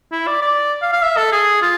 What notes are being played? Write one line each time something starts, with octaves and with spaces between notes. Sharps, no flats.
E4
D5
D5
F5
F5
E5
A4
G#4
F4